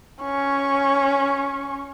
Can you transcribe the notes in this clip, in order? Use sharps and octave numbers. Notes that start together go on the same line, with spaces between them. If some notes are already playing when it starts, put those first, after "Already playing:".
C#4 C#6